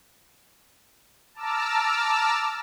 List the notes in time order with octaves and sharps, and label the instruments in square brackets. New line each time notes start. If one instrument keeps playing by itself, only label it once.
[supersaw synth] A5 A#5 D6 E6 F6